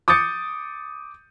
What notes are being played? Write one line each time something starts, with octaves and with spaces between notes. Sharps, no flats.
D6 D#6 G6 A6 C#7